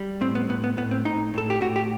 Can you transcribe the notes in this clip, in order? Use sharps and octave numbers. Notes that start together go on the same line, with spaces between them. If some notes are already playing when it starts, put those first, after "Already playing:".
Already playing: G3
A2 C4
B3
A2 B3
B3
A2 B3
C4
A2 D#4
A2 A4
G4
A2 F#4
G4